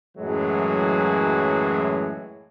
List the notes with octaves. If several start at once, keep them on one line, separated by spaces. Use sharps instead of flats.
F#2 A2 E3 F#3 G#3